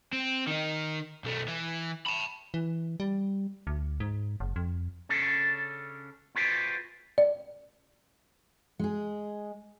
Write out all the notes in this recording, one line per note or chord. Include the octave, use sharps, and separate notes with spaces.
C4
D#3 D#4
B1 A3
E3
A5 B5
E3
G3
D2
G#2
F#1
F2
C#3 C#4 D4 A4
F4 F#4 G#4 B4 C5 D5
D5
G#3 G#4